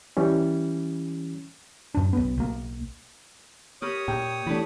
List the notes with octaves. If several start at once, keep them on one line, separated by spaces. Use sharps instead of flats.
E3 G3 C#4
F#2 D4
B1 B3
B1 A#3
G4 A#4 C#5 B5 D#6
A#2 G5
E3 A3 D4 G4 B5